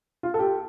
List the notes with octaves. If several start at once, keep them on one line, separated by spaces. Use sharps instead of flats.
F4
A4
G4